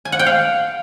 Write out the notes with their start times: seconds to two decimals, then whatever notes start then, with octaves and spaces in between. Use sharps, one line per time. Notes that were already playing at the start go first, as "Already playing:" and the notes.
0.05 G#5
0.12 F#5
0.19 G5
0.26 F5